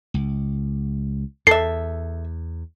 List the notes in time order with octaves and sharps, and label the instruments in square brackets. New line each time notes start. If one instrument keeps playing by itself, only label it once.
[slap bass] C#2
[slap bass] E2 [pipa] A4 E5 [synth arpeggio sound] C7